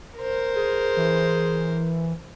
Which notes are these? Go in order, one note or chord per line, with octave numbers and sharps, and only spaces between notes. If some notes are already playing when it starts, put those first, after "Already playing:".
A#4 C5
G#4
E3